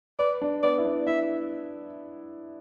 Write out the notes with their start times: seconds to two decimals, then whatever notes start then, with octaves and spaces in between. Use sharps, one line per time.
0.19 B4 D5
0.42 D4
0.63 B3 D5
0.78 E4
0.85 D4
1.07 E4 E5